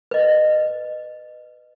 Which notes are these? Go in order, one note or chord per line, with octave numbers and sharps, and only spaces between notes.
B4 D#5